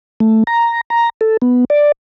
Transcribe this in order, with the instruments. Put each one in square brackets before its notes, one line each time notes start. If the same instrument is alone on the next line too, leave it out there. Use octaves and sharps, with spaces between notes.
[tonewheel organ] A3
A#5
A#5
A4
B3
D5